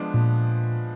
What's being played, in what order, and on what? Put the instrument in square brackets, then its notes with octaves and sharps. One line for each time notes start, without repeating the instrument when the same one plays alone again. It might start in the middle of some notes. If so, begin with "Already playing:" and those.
Already playing: [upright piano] F3 G#3 B3 D4
[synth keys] A#2